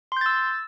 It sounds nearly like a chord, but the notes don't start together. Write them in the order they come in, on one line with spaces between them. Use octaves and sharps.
C6 G6 A6 E6